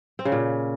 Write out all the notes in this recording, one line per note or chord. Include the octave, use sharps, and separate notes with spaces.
C4
C#3
A#2